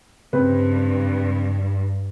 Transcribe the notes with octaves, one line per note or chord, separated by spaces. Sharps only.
G2 C#3 C4 B4